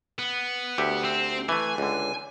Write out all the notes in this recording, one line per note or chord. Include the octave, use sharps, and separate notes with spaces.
B3
D2 G4 E5
C4
E3 A3 G#5
C#2 D3